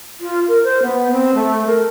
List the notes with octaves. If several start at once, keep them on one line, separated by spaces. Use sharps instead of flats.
F4
A#4
C5
B3
C4
A3
A#4